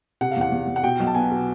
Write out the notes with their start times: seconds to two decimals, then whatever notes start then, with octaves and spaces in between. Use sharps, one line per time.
0.21 C3 F#5
0.31 F5
0.37 E2 F#5
0.52 E2
0.68 E2
0.76 F#5
0.83 B2 G5
1.00 B1
1.07 A5
1.15 B3 G#5
1.31 B2